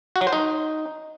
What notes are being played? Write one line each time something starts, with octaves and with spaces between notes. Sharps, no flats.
F#4
F#3
C5
D#4